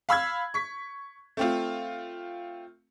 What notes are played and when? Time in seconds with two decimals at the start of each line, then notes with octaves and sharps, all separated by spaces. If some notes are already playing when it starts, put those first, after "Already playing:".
0.09 F5 B5 E6 G#6
0.54 C#6 B6
1.37 A3 C4 F4